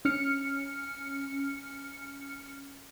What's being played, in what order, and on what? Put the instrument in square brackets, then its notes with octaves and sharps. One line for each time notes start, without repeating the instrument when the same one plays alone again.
[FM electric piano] C#4 F6 C#7